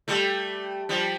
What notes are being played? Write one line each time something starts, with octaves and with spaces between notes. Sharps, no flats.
G3 A3
F3 G3